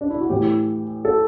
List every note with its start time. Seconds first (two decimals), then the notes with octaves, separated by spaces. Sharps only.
0.01 D4
0.10 E4
0.20 F#4
0.30 A2 E3 G4
1.05 A4